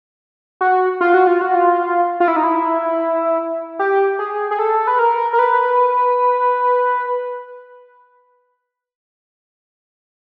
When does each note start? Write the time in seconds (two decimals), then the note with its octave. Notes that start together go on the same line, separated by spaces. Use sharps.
0.61 F#4
1.01 F4
1.14 F#4
1.27 F4
1.41 F#4
1.55 F4
2.20 F4
2.28 E4
2.36 D#4
2.44 E4
3.79 G4
4.19 G#4
4.51 G#4
4.59 A4
4.87 B4
4.99 A#4
5.33 A#4
5.39 B4